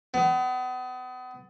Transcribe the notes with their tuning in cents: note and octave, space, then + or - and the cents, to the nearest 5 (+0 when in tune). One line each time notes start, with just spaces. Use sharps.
B3 +35